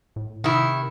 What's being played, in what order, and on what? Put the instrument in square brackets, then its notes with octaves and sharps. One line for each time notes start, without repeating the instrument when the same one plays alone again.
[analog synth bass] A2
[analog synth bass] C3 [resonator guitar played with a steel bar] D#3 E4